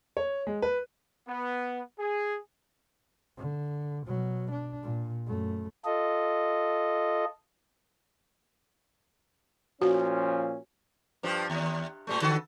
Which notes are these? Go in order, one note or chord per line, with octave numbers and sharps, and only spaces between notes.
C#5
G#3
B4
B3
G#4
D3
B2 F#3
D4
A#2
F#2 A3
F4 A4 D#5
A#2 F3 C#4 F#4
G2 F3 G4
D#2
A2 G3 A3
D3 F#4 A4